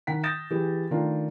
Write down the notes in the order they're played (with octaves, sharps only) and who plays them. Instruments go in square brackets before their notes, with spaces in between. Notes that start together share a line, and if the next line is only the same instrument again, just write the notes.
[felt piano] D#3 F#5 B6
D#6 G6 A6 A#6 E7
E3 G4 G#4
D#3 A3 D4 F4